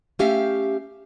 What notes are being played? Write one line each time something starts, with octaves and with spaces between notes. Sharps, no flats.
A3 C#4 G4 E5 F5